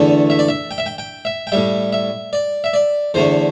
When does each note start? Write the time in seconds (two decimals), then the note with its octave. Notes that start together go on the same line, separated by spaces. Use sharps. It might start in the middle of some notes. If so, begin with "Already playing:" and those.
Already playing: E2 D3 A3 A4
0.30 E5
0.39 D5
0.49 E5
0.71 G5
0.78 E5
0.86 G5
0.98 G5
1.25 E5
1.47 G5
1.52 A2 G3 E5
1.93 E5
2.33 D5
2.64 E5
2.73 D5
3.14 E2 D3 A3 C5